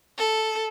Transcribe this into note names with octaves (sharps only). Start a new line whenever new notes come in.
A4